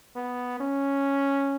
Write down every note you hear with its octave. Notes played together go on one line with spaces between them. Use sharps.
B3
C#4